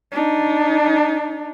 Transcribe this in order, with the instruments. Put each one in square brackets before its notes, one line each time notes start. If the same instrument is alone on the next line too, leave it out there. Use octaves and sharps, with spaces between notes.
[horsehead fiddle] D4 D#4